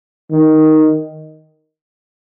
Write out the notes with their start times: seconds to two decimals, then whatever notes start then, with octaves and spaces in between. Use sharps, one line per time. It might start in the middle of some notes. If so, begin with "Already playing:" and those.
0.31 D#3